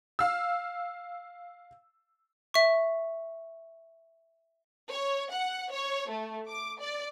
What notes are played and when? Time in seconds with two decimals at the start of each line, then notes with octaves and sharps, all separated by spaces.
0.19 F5 E6
2.54 E5 C#6
4.91 C#5
5.32 F#5
5.72 C#5
6.09 A3
6.48 D6
6.80 D5